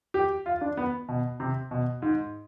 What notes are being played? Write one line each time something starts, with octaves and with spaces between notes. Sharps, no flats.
G4
F4
D4
B3
B2
C3
B2
G#2